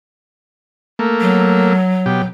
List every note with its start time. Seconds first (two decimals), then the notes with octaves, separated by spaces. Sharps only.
0.99 A3 A#3
1.20 F#3
2.06 B2 G4